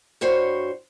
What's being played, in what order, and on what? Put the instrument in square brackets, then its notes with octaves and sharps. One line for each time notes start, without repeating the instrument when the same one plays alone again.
[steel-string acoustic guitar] G2 F#4 C5 C#5